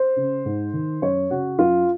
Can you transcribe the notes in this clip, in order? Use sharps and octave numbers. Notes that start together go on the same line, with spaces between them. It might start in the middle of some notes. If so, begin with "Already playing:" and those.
Already playing: C5
C#3
G#2
D#3
F#2 C#5
C#3 F#4
F#2 F4